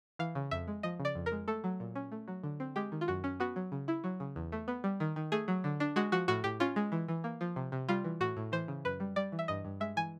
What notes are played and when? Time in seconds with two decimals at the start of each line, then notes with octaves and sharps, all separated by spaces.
0.19 E3 F5
0.35 C#3
0.51 F2 E5
0.68 G#3
0.83 F3 D#5
1.00 C#3
1.05 D5
1.15 F2
1.26 A#4
1.32 G#3
1.48 A3 A4
1.64 F#3
1.80 A#2
1.96 C#4
2.12 A3
2.28 F#3
2.44 D3
2.60 C4
2.76 G#3 G4
2.92 D#3
3.01 F4
3.08 F#2 F#4
3.24 C#4
3.40 B3 F#4
3.56 F#3
3.72 C#3
3.88 E4
4.04 F#3
4.20 C#3
4.36 E2
4.52 A3
4.68 B3
4.84 G3
5.00 D#3
5.16 D#3
5.32 A3 G#4
5.48 F#3
5.64 D3
5.80 D4
5.96 G#3 F#4
6.12 F3 F#4
6.28 A2 F#4
6.44 A2 G4
6.60 C#4 F4
6.76 G#3
6.92 E3
7.08 E3
7.24 A#3
7.41 F3
7.56 C3
7.72 C3
7.89 G3 F4
8.04 E3
8.20 A2 F#4
8.37 A2
8.52 E3 C5
8.68 C#3
8.85 F#2 B4
9.00 G3
9.16 G3 D5
9.32 E3
9.39 E5
9.48 G2 D#5
9.65 G2
9.80 G#3 E5
9.96 E3 G#5